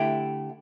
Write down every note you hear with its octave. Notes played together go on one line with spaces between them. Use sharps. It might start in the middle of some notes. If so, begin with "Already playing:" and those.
Already playing: D3 A3 E4 G4